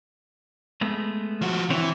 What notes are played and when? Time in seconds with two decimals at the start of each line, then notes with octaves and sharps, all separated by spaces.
0.81 G#3 A3 B3
1.41 F3 F#4
1.70 D3 E3 C4 C#5